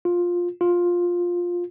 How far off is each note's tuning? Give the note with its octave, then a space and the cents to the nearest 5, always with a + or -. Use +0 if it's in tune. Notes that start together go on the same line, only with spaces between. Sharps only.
F4 +10
F4 +10